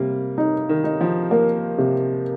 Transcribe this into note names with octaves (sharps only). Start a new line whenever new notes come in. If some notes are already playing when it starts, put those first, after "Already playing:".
Already playing: C3 G3 A#3
D#4
D#3
D#4
F3
A#3
C3